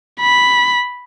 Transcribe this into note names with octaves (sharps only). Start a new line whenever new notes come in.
B5